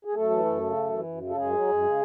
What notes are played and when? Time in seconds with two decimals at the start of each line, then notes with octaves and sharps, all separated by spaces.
0.05 G#4
0.15 F#2 A3 A4
0.30 E3
0.45 F#2
0.61 C#3
0.76 F#2
0.91 E3
1.07 F#2
1.22 C#3
1.29 A4
1.37 F#2 G#3 G#4
1.53 F#3
1.68 F#2
1.84 C#3